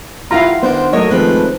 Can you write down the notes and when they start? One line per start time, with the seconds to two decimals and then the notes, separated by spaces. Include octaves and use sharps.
0.31 E4 F4 G4 D5 F5 F#5 A#5 C6
0.63 D#3 B3 D4 C5 F#5
0.93 F#3 A3 A#3 C#5 D#5
1.11 D#3 F3 G#3 A3 C4 B4